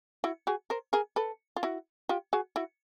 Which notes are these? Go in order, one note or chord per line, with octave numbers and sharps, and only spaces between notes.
E4 F#4
F#4 G#4
A#4 C5
G#4 A#4
A4 B4
F4
E4 F#4
F4 G4
F#4 G#4
E4 F#4